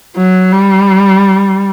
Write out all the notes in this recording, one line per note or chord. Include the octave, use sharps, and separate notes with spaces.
F#3
G3